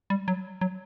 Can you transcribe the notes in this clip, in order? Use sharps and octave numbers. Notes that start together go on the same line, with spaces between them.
G3
F#3
F#3